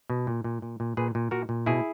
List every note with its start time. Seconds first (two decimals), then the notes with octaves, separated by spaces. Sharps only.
0.10 B2
0.27 A#2
0.44 A#2
0.62 A#2
0.80 A#2
0.97 A#2 G#4 B4
1.15 A#2
1.31 A#2 F#4 A#4
1.49 A#2
1.66 B2 E4 G#4